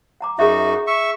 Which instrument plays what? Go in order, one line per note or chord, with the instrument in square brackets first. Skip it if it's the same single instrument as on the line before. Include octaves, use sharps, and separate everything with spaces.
[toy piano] F#5 A#5 D6
[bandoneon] F#2 D#4 F#4 [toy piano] G#4 E5
[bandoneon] E5 C#6